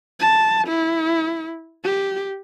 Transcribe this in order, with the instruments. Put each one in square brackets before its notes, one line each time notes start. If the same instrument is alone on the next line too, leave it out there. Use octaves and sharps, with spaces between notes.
[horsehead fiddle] A5
E4
G4